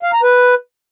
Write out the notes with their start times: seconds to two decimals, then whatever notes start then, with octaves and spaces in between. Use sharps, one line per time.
0.03 F5
0.13 A#5
0.23 B4